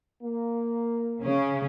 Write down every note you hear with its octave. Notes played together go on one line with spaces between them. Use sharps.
A#3
C#3 C#4